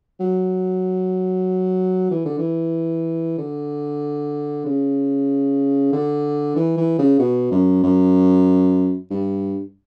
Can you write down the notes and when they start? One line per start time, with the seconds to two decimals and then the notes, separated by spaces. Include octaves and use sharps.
0.20 F#3
2.11 E3
2.25 D3
2.39 E3
3.38 D3
4.65 C#3
5.93 D3
6.56 E3
6.77 E3
6.99 C#3
7.19 B2
7.51 F#2
7.84 F#2
9.11 G2